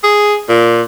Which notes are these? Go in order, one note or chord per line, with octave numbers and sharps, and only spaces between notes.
G#4
A#2